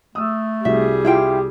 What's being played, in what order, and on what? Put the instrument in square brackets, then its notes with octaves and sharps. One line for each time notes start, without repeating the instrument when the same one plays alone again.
[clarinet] A3 [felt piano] D#6 E6
[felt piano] C2 F#4 [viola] G3 G#4 [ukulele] E5
[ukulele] E4 F4 G5 [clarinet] G4